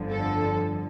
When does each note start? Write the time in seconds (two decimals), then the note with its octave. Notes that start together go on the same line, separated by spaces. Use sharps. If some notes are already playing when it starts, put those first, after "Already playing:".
Already playing: G1 F2 D3 F3
0.10 A4